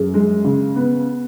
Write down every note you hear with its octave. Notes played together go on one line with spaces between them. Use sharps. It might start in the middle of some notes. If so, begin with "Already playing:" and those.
Already playing: F#2 G#4
G#3
C#3
B3